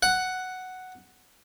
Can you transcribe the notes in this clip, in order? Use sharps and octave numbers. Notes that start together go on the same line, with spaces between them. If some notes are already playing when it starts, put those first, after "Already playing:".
F#5